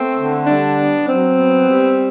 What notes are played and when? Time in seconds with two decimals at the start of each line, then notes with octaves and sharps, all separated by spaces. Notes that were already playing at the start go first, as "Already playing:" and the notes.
Already playing: A3 B3 C4
0.17 D3
0.47 G3 D4
0.78 B3
1.08 F#3 C4
1.38 B3
1.69 G3